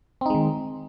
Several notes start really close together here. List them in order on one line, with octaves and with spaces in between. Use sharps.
C4 D#4 G#3 D#3